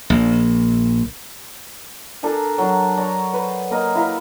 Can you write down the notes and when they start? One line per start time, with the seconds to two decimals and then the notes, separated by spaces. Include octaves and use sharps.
0.10 A#1
2.23 D4 A4 A#4 G#5
2.58 F#3 D4
2.97 C#5 D5 A#5
3.33 B4 C5
3.70 A#3 A#4 D#5
3.95 E4 F#4 A#4 F5